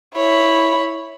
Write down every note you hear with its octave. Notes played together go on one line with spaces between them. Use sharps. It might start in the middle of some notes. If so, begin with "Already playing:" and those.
E4 C#5 B5